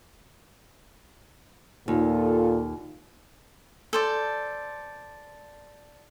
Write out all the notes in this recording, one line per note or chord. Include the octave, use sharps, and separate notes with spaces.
D#2 A#2 F4 A4
A4 C5 D5